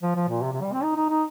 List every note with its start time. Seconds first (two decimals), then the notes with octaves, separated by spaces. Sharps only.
0.02 F3
0.16 F3
0.29 A#2
0.42 C3
0.52 C3
0.62 G3
0.73 C4
0.83 D#4
0.96 D#4
1.10 D#4